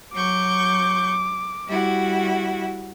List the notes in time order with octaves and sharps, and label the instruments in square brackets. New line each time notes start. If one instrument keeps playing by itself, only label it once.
[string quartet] F#3 C#6 G6 [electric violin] D6
[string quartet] G3 E4 F#4